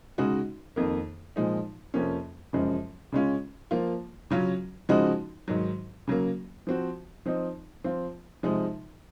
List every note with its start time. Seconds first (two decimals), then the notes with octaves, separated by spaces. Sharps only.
0.18 C#3 G#3 D#4 F#4
0.76 F2 D#3 A#3
1.36 A#2 F3 G#3 D#4
1.94 F2 C3 F3 A#3 C#4
2.53 F#2 C#3 F3 G#3
3.12 C#3 G#3 C#4 F4
3.71 F3 A#3 F4
4.30 C#3 F#3 C#4 F4
4.89 C#3 F3 G#3 D#4 F#4
5.48 G#2 D#3 F#3
6.07 C#3 F#3 A#3
6.67 F3 C4 F#4
7.26 F3 C4 D#4
7.84 F3 C4 F4
8.43 C3 F3 G#3 D#4